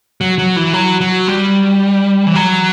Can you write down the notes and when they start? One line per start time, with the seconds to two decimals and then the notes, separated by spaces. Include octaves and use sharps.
0.21 F#3
0.38 F#3
0.56 E3
0.73 F#3
1.01 F#3
1.28 G3
2.27 E3
2.35 F#3